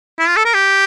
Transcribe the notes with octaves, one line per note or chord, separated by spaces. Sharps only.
E4
F4
A4
A#4
G4